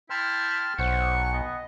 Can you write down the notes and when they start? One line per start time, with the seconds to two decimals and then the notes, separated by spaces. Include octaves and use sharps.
0.10 E4 G5 A5 C6 F6
0.78 B1 C5 F#5 C#6
1.33 B3 D#5